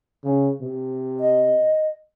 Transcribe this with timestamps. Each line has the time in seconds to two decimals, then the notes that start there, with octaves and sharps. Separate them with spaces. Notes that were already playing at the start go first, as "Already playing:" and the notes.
0.24 C#3
0.61 C3
1.20 D#5